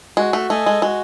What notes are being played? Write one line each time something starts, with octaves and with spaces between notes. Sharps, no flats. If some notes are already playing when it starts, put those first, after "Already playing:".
G#3 F#4
A3
A3 A4 D#5 G#5
G#3
G#3 F#4